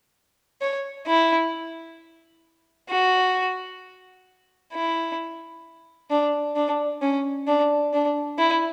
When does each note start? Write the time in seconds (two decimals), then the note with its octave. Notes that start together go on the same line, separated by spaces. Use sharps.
0.61 C#5
1.07 E4
2.89 F#4
4.73 E4
6.10 D4
6.56 D4
7.02 C#4
7.47 D4
7.93 D4
8.38 E4